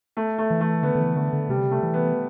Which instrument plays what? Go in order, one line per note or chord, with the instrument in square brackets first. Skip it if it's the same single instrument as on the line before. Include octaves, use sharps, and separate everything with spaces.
[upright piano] A3
A3
[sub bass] E3
[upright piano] A3
[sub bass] D3 [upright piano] B3
[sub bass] D3
E3
[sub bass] D3 [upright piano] A3
[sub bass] D3
[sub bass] C3 [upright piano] G3
[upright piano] A3
[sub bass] E3
[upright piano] B3